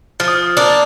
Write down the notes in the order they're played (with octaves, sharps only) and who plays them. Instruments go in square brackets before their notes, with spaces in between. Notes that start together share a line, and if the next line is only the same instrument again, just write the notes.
[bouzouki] F3 [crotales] F6
[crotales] D#6
F6
[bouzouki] A#3 D4